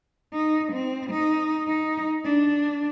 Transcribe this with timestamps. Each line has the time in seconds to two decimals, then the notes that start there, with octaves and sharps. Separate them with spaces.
0.33 D#4
0.73 C4
1.10 D#4
1.68 D#4
2.25 D4